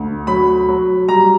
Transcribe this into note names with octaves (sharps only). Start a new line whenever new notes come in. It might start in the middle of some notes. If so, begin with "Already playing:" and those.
Already playing: D2
F#3 B5
F#3
G3 A#5